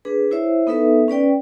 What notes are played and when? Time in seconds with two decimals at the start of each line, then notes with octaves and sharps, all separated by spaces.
0.05 D4 G#4 B4
0.31 E4 C5 C#5 E5
0.67 B3 D#4 A4 B4 E5
1.08 C#4 B4 D5 G5